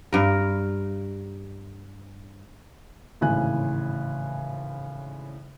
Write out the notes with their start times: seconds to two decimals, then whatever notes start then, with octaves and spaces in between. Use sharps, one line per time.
0.13 G2 A#4
3.21 G#1 A2 C#3 E3 G#5 F#6